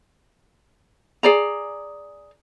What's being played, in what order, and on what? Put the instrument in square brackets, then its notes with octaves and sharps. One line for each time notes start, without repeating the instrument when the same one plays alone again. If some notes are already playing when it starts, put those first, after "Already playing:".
[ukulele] G#4 D5 A#5